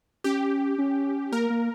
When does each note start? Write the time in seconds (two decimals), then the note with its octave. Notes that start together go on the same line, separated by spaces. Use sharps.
0.24 C#4 G4
0.78 C#4
1.32 A#3 A#4
1.50 A#3